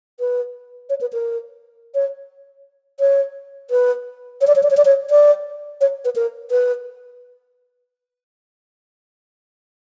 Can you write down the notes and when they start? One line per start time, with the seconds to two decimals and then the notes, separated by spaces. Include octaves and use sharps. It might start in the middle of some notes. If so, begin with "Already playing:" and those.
0.20 B4
0.89 C#5
1.01 B4
1.13 A#4
1.94 C#5
3.00 C#5
3.70 B4
4.41 C#5
4.47 D5
4.55 C#5
4.63 D5
4.70 C#5
4.77 D5
4.85 C#5
5.10 D5
5.81 C#5
6.05 B4
6.15 A#4
6.51 B4